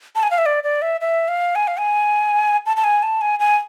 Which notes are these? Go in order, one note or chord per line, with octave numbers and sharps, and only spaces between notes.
A5
G#5
F5
E5
D5
D5
E5
E5
F5
G#5
F5
G#5
A5
A5
G#5
A5
G#5
G#5